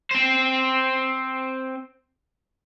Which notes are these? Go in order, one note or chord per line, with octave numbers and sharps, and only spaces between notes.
C4 C5